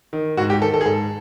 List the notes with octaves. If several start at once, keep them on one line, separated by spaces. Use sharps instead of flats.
D#3
G#2 F#4
G4
D#3 A4
A4
G#4
G#2 A4